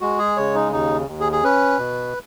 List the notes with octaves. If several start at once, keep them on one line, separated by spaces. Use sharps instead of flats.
G#3 F#4
G#4
C#3 C#5
D#4
D#2 D#4
D#2
G#4
G#4
C#4 B4
B2